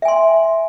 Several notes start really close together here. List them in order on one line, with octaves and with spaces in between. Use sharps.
E5 G#5 C6